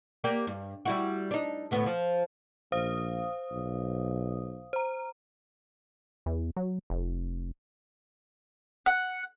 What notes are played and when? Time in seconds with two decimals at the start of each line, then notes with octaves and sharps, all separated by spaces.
0.24 A#3 G4 D5
0.47 G2
0.85 G3 E4 F#4
1.31 D4 D#4
1.71 D2 A2 B3
1.86 F3
2.72 A#1 C5 F5 D#6
3.51 B1
4.73 C5 A#5
6.26 E2
6.57 F#3
6.90 F1
8.86 F#5